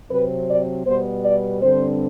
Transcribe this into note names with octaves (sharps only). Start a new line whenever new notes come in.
C3 F#3 C4 B4
D5
B2 G3 B3 C5
D5
G2 D3 G3 C4 C5